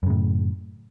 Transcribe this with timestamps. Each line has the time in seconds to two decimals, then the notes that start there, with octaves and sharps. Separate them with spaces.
0.03 F#2
0.06 C#3
0.10 A2